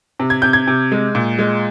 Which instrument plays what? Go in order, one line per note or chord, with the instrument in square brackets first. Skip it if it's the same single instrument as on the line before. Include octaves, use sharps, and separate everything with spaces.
[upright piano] C3
G#6
C3 G6
G#6
C3
G#3
A#2
G#3